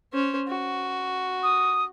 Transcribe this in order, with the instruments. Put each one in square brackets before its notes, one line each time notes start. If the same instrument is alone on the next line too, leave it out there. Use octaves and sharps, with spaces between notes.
[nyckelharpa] C#4 C5
F#4
[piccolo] D#6